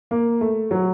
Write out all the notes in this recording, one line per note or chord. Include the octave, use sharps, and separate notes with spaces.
A#3
A3
F#3